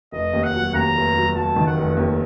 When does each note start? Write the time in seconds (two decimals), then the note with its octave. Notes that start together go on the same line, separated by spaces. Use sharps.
0.12 F1 D#5
0.33 D#2
0.43 F#5
0.54 F#3
0.74 D#2 A#5
0.94 F1
1.16 F#3
1.35 F#3 A5
1.56 D#3
1.66 F#5
1.77 F1
1.97 D#2